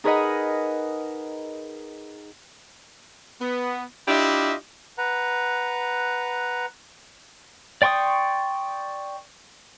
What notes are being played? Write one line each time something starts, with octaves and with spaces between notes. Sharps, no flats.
D#4 G#4 A#4 B4 D#5 F#5
B3
D4 E4 F4 G4 D#5 E5
B4 F#5 A#5
D5 G5 C6 C#6 D#6